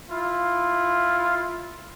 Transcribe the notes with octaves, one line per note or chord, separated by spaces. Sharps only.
E4 F4